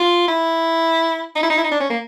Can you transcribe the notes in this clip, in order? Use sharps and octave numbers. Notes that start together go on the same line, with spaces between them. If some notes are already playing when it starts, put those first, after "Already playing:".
Already playing: F4
E4
D#4
E4
D#4
E4
D#4
D4
C#4
A#3